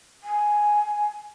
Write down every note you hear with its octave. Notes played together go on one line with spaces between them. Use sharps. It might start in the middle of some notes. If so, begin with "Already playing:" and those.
G#5